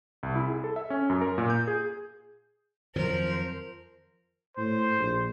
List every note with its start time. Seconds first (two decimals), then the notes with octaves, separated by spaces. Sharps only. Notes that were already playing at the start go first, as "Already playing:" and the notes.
0.23 C2
0.35 E4
0.48 G#4
0.64 A4
0.76 E5
0.90 C#4
1.10 F#2
1.21 A#4
1.38 A#2
1.50 G6
1.67 G#4
2.96 F2 D#3 F3 F#3 A#4 C5
4.58 A2 C5
4.98 A#1